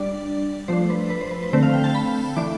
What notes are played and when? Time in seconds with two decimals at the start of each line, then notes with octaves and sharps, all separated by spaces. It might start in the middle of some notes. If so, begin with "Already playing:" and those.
Already playing: G3 D4 D5
0.68 F3 A3 D4 C5
0.90 B4
1.10 B4
1.21 C5
1.31 B4
1.43 B4
1.53 D3 A3 C4 C5
1.63 F5
1.74 G5
1.84 A5
1.95 B5
2.37 E3 A3 D4 D6